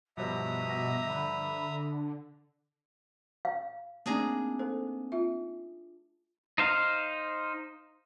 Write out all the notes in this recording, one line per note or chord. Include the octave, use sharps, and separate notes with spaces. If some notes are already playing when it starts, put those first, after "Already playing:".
G2 B2 F3 D#5 E5 A#5 D#6
D3 B5
F5
A3 A#3 C4 D4 D#4 G#4 A#5
A4 C5
F4 E5
D#4 C5 F5